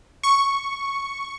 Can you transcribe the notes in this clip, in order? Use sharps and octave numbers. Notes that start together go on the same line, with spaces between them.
C#6